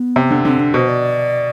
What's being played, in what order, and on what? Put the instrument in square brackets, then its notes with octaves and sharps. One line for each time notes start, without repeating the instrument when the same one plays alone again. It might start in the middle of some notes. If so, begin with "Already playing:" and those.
Already playing: [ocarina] B3
[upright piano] C3
D3
[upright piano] D3 [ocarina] C4
[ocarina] D4
[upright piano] B2 [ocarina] C5
[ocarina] D5